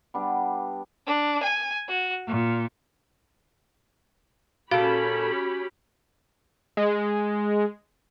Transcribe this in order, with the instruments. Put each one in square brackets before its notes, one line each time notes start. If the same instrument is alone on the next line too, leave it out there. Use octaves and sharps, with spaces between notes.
[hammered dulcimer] G3 B3 D4
[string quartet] D4
G#5
F#4
A#2
[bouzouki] A#2 A4 [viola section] C#4 G4 B5 [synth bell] F#4 [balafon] F5
[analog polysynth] G#3